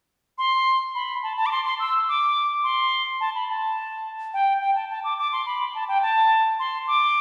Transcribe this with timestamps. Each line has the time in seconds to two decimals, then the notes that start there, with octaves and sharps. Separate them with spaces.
0.38 C6
0.95 B5
1.23 A5
1.37 A5
1.46 D6
1.52 C6
1.65 C6
1.80 E6
2.08 D6
2.64 C6
3.20 A5
3.35 B5
3.48 A5
4.34 G5
4.61 G5
4.75 A5
4.90 A5
5.04 D6
5.19 D6
5.33 C6
5.46 B5
5.75 A5
5.89 G5
6.02 A5
6.59 C6
6.87 D6